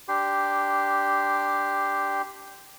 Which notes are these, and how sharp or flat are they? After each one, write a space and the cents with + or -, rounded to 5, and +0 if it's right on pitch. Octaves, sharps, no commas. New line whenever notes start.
D4 -5 G4 +0 C6 -20